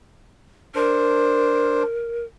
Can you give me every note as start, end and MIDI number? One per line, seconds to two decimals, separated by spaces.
0.75 1.83 62
0.75 2.24 70
0.75 1.83 72